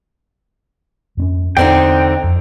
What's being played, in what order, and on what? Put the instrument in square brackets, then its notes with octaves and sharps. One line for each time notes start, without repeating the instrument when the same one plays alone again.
[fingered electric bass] F2 C4 C#4
[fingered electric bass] E2 [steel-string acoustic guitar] D3 C4 D#4 [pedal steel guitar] G5
[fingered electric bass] F2